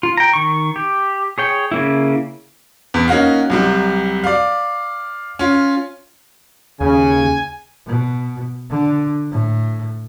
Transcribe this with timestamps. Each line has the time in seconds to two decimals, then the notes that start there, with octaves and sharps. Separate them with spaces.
0.03 F4
0.17 G5 A#5
0.33 D#3 C#6
0.76 G4
1.38 G#4 C#5 G5
1.72 C#3 A#3 E4
2.94 E2
3.08 A#3 C#4 D#4 F#4 F5
3.50 C2 F#3 G3
4.24 D5 F5
5.39 C#4 F4
6.80 D#2 C#3 G#5
7.86 B2
8.70 D3
9.31 A2